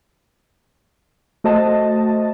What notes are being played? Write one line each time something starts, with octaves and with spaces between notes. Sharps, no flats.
A3 F#4 C5 D#5 A5